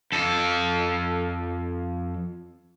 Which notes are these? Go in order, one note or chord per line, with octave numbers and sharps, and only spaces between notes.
F2 A4